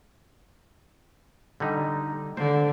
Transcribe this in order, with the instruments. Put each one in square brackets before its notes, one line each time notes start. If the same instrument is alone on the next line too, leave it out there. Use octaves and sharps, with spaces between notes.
[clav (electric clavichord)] D3 G3 D#4
[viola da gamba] D3 [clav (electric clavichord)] C5